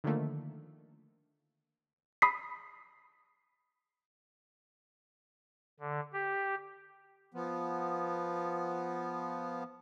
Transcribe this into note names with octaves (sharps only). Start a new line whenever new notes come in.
D3 D#3 F3 A3 A#3
B5 D#6 B6 C7
D3
G4
F3 B3